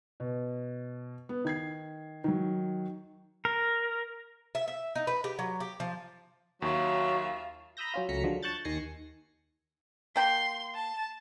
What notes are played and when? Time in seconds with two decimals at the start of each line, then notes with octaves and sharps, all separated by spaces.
0.20 B2
1.29 B3
1.45 D#3 G#6 C7
2.24 D#3 F#3
3.45 A#4
4.55 E5
4.68 E5
4.95 D#4
5.07 B4
5.24 G4
5.39 F#3
5.60 G4
5.80 F3
6.62 D#2 F#3 F4 E5 C#6
7.77 A#5 B5 D#6 E6 G6 A#6
7.94 F#3 C#4 F4
8.09 C#2 F#3 A3 A#5 B6 C#7
8.24 D3 F3 F#3 G#3
8.43 A5 C#6 F#6 G6 A6
8.65 D#2 D#3 G#5 A#6 C7 C#7
10.16 A#3 G5 C6
10.75 A5